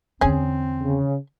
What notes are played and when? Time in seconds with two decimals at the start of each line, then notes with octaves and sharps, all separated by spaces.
0.21 E2 D3 C4 C#4 G#4
0.81 C#3